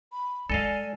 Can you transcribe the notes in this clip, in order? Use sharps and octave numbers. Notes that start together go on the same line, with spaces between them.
B5
G#3 A4 D5 D#5 F5 G#5